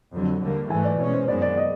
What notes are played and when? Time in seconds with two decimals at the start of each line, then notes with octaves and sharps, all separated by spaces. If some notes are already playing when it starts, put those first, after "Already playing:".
0.13 F2 D3 F#3
0.41 D#2 D3 G3 A#3
0.70 G#2 E3 A3 G#5
0.84 D5
0.99 B2 G#3 C#4 C#5
1.13 C5
1.28 F#2 D#3 G#3 B3 D5
1.42 D5
1.57 D#5